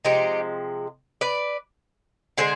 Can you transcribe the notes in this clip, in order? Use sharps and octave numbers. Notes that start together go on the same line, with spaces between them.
C3 F3 G#3 D#4 G4
B4 D5
D3 G#3 G#4 C5